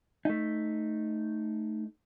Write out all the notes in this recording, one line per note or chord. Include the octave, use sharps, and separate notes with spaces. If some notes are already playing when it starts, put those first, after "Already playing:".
A3 D#4